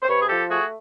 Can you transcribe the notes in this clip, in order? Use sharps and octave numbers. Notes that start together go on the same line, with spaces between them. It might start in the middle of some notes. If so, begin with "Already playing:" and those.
C5
C3 B4 C#5
G#4
F3 G4 A4
A3 F#4 G#4